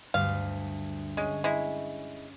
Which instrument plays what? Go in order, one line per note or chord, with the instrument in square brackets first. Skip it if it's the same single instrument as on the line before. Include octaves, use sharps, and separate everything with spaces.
[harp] D2 G2 [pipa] F5
[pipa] G#3 [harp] C#4
[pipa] G#3 E4